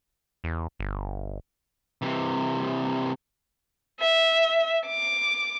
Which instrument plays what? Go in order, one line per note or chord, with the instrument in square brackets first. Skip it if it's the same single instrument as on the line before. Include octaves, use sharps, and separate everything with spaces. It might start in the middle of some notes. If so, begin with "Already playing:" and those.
[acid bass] E2
G1
[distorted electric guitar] C3 E3
[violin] E5
D6